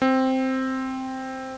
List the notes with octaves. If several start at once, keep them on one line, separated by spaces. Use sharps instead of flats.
C4